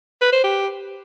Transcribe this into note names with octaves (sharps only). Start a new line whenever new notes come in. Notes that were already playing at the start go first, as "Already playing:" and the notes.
B4
C5
G4